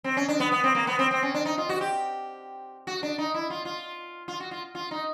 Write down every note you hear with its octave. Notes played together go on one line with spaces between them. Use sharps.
C4
C#4
D4
B3
B3
C4
A#3
B3
C4
C4
C#4
D4
D#4
F4
F#4
G4
F#4
D4
D#4
E4
F4
F4
F4
F#4
F4
F4
D#4